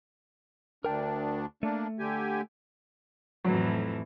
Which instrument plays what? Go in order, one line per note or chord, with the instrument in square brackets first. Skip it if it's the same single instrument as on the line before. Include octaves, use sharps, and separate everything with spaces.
[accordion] D2 D4 [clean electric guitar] A#4 G5
[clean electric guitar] A3 [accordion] A#3 D4
[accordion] D3 G4 G#5
[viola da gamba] F2 A2 E3 [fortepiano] F#3